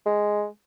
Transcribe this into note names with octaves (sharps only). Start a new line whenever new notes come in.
G#3